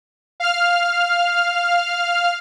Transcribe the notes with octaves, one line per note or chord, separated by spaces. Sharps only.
F5 F6